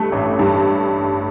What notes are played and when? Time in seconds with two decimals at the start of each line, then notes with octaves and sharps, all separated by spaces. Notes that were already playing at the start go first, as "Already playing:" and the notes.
Already playing: G2 A3
0.12 A1
0.39 G2